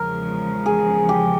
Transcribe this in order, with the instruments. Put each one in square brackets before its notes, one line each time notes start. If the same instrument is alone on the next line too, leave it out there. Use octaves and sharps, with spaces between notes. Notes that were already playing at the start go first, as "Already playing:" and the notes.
Already playing: [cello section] E2 C#3 F3 G#3 [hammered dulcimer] A#4
[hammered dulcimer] G#4
G4